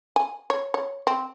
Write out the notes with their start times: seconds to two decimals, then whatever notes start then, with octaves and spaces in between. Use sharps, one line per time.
0.16 G#5
0.50 C#5
0.74 C#5
1.07 C4